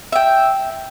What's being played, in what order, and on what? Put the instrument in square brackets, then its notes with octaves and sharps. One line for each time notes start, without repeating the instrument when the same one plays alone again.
[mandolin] E5 G5